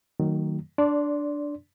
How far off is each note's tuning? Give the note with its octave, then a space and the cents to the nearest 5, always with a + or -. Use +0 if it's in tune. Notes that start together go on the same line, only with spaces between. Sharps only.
D#3 +0 F#3 +5 A3 +45
D4 +0 D5 -20 C6 +0